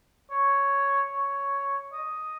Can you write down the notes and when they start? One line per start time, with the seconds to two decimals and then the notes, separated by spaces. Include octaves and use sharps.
0.30 C#5
1.12 C#5
1.93 D#5